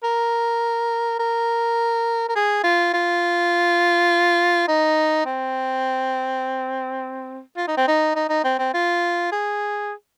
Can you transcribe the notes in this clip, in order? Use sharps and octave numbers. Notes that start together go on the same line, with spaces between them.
A#4
A#4
A#4
G#4
F4
F4
D#4
C4
F4
D#4
C4
D#4
D#4
D#4
C4
C4
F4
G#4